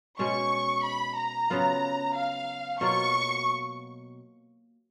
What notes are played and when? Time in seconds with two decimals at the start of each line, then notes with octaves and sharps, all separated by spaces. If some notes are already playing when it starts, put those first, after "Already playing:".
0.19 B2 G#3 C#4 C#6
0.84 B5
1.17 A#5
1.50 C#3 F#3 B3 F4
2.15 F5
2.81 B2 F#3 A#3 F4 C#6